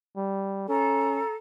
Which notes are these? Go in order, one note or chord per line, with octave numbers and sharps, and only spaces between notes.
G3
C#4 A4 A#5